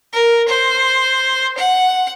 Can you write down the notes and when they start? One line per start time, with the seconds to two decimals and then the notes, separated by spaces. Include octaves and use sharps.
0.13 A#4
0.48 C5
1.58 F#5